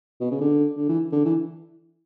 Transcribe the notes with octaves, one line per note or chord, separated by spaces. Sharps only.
B2
C#3
D3
D3
E3
D3
E3